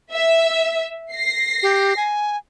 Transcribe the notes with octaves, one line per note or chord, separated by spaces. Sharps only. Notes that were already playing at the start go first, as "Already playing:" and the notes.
E5
A#6 C7
G4
G#5